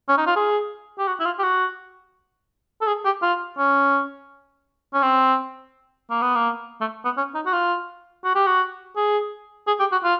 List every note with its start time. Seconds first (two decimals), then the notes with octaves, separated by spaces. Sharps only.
0.09 C#4
0.18 D#4
0.27 F4
0.36 G#4
0.99 G4
1.07 F#4
1.20 E4
1.25 F4
1.39 G4
1.43 F#4
2.81 A4
2.87 G#4
3.05 G4
3.22 F4
3.58 C#4
4.94 C#4
5.02 C4
6.10 A#3
6.22 B3
6.35 A#3
6.81 A3
7.05 B3
7.17 C#4
7.35 D#4
7.46 F#4
7.53 F4
8.24 F#4
8.35 G4
8.47 F#4
8.96 G#4
9.67 G#4
9.80 G4
9.92 F#4
10.04 F4